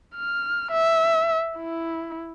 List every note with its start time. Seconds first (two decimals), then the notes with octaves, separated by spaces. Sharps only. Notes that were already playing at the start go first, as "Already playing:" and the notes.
0.16 F6
0.72 E5
1.58 E4